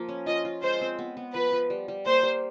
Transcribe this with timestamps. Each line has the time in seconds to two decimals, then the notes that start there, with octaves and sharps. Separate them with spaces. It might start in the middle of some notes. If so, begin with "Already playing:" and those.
Already playing: F3 A#3
0.09 C#4
0.26 F4 D#5
0.45 F4
0.62 G#3 C5
0.81 C4
0.99 B3
1.17 B3
1.34 F3 B4
1.52 F3
1.70 G3
1.88 G3
2.06 A#3 C5
2.23 G3